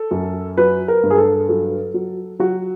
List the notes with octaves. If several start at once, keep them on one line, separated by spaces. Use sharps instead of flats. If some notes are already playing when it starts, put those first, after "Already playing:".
Already playing: A4
F#2
F#3 B4
A#4
G2
G#4
A4
F#3 A4
F#3
F#3 F#4